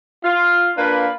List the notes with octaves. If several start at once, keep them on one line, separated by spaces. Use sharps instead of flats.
F4
A#3 D4 F4 B4